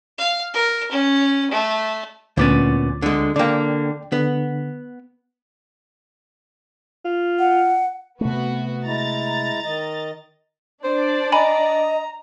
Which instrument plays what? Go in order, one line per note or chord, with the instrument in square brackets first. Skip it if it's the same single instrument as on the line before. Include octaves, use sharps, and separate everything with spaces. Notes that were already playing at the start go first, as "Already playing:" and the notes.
[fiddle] F5
A#4
C#4
A3
[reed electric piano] D2 D6 A6 [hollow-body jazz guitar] A#2 B3 C#4
[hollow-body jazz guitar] D3 G#3
[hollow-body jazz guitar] D3 A#3 [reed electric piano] D5 G5
[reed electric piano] D3 [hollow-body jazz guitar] B3
[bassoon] F4
[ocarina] F#5
[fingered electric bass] C3 A3 [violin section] B3 F#4
[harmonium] G#3 E4 [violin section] A#5 A6
[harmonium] D#3 D#5
[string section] D4 D5 [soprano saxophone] C5
[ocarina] D#5 [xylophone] G#5 B5 [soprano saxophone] A#5